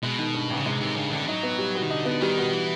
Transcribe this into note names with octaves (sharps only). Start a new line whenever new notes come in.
B2 G#3
D#3
G2
A1
C#3
C3 G#3
C3 D#3
G2 C#3
A1 D3
F#3 D#4
B3
G3
B2
D#3
D3 D#4
B3
D#3 G3
B2
E3